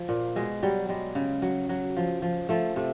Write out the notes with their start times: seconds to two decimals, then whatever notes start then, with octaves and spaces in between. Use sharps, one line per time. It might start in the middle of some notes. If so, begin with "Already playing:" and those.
Already playing: F3
0.09 A#2
0.36 B2 G#3
0.63 F#3 G3
0.89 G3 G#3
1.15 C#3
1.42 F#3
1.69 F#3
1.97 F3
2.22 F3
2.49 F3 A3
2.76 C3 A3